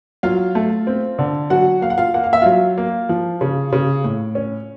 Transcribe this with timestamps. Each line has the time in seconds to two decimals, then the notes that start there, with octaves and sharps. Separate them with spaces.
0.23 F#3 F4 F5
0.55 A3
0.87 C4
1.19 D3
1.50 F#3 F#4 F#5
1.81 A#3 F5
1.90 F#5
1.98 F4 F5
2.14 A#3 F#5
2.24 F5
2.33 E5
2.41 F#3 F4 F5
2.77 A#3
3.09 F3
3.41 C#3
3.72 C#3
4.04 A2
4.35 C#4